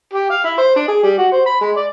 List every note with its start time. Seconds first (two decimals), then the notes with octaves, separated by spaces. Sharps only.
0.14 G4
0.30 F5
0.44 E4
0.58 C5
0.76 D4
0.88 G#4
1.03 G3
1.18 F#4
1.32 C5
1.46 B5
1.61 G#3
1.77 D5